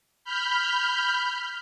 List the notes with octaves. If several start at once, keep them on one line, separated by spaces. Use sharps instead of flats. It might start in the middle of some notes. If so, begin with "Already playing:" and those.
B5 F6 G6